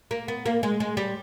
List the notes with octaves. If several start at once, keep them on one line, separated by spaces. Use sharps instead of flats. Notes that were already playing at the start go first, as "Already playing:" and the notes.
A#3
B3
A#3
G#3
G#3
G3